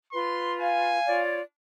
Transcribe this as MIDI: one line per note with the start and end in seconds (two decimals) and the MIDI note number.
0.12 0.98 65
0.12 0.98 71
0.12 0.54 84
0.61 1.23 77
0.61 1.21 80
1.07 1.40 65
1.07 1.40 73
1.07 1.40 74